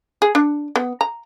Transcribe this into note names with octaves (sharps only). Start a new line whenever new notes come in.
G#4
D4
B3
A#5